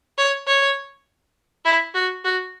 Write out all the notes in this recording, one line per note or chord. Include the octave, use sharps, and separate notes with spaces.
C#5
C#5
E4
F#4
F#4